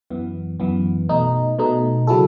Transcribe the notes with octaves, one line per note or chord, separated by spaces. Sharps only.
F#2 E3 B3
F#2 E3 B3
B2 A3 D#4
B2 A3 D#4
C#3 F#3 C#4 E4 A4